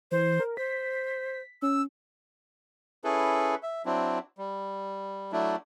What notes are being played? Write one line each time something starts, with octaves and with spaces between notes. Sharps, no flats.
E3 C5
A#4
C5 B6
C#4 E6
C#4 E4 G#4 A4 B4
E5
F#3 C4 D4 E4
G3
F#3 A3 D4 E4